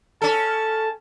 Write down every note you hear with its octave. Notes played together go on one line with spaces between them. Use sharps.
C#4 A4 A5